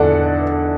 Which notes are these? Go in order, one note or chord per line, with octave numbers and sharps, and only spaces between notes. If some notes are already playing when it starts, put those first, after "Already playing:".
Already playing: E2 D3 D4 A4 D5 F#5